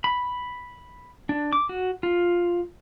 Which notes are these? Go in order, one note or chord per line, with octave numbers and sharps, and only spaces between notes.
B5
D4
D6
F#4
F4